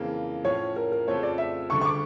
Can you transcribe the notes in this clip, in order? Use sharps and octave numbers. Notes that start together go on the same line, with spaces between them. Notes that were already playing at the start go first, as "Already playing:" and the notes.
Already playing: F2 C#3 E3 A#3
A2 F3 C#4 C#5
A#4
A#4
F2 C#3 F3 A3 C#5
D5
E5
D2 C#3 G3 D4 A4 C#6
C#6
D6